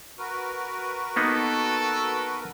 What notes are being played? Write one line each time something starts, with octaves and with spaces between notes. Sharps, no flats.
F#4 A#4 B4
A#3 B3 D#4 A4